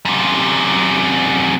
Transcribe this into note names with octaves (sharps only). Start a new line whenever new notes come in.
F#2 C3